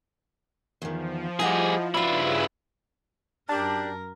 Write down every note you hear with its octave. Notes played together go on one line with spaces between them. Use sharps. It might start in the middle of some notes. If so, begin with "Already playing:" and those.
E2 D#3 F3
G3 E4 G#4 D#5 F#5
G2 C#3 E4 F4 B4 D5 F#5
F#2 D4 G4 A#4 A5